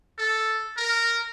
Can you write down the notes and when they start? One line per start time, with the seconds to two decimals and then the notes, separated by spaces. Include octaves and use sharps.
0.18 A4
0.77 A#4